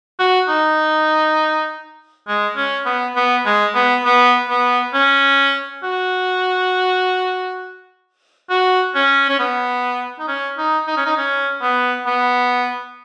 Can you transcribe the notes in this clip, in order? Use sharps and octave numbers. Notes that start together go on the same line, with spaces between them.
F#4
D#4
G#3
C#4
B3
B3
G#3
B3
B3
B3
C#4
F#4
F#4
C#4
C#4
B3
D#4
C#4
D#4
D#4
C#4
D#4
C#4
B3
B3